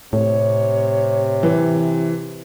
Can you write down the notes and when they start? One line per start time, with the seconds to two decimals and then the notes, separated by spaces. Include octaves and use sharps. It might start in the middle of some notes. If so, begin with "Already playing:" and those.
0.13 A2 C3 C#5
1.43 E3